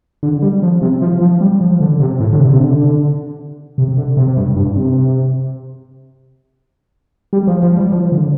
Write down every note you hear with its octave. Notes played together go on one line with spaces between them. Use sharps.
D3
G3
F3
C3
F3
F3
G3
F3
D3
C3
A2
D3
C3
C3
D3
C3
D3
C3
G2
G2
C3
G3
F3
F3
G3
F3
D3